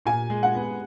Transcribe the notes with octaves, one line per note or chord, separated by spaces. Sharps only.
A#2 G#5
G#3
F#5
B3